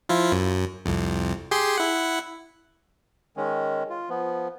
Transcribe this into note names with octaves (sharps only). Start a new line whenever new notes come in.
F3 E4 F4
F#2
C2 F2
G4 G#4 C6
E4 F#5
D#3 G#3 C#4
F4
F3 B3